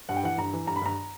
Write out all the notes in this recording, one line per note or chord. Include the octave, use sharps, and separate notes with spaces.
G2 F#5
G5
E3 F#5
G2 A#5
E3
G2 A#5
B5
G2 A#5